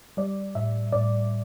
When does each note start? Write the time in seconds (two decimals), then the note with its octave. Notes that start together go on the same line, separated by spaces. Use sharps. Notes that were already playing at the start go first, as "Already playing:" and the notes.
0.17 G3 D5
0.55 A2 E5
0.92 A2 D5